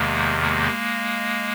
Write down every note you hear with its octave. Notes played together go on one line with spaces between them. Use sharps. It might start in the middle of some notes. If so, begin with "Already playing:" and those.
Already playing: E2 C3 D#3 G#3 A#3
G#3 A#3